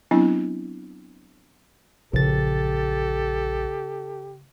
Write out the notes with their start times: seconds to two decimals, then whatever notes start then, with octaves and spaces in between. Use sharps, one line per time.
0.11 F#3 B3 C4 D4 E4
2.13 A#1 C#3 D4 G4 A4 A6